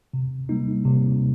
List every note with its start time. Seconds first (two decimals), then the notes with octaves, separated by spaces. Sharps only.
0.13 C3
0.49 G3 A#3 D#4
0.85 C3